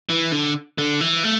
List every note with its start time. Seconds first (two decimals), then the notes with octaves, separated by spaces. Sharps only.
0.09 E3
0.32 D3
0.78 D3
1.01 E3
1.24 A3